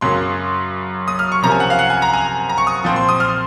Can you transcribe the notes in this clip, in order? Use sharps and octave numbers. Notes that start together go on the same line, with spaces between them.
F#2 C#3 F#3 A#3 C#4 C6
D#6
F6
C#6
C3 F3 A#3 C#4 A#5
G#5
F#5
F5
F#5
G#5
A#5
G#5
A#5
C#6
D#6
A#2 F3 C4
C6
D#6
F6